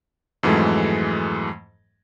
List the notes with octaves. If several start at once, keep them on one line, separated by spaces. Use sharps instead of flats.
F2 G#2 E3 F#3 G#3 A3